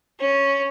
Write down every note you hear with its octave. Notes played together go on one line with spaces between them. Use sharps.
C#4